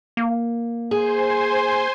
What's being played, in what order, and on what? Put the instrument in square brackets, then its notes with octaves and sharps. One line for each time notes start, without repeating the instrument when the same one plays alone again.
[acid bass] A#3
[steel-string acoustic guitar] G#4 [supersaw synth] C5 G#5 C6